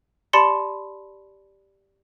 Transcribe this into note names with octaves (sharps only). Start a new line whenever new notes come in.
G4 D5 A5 B5 C6 C#7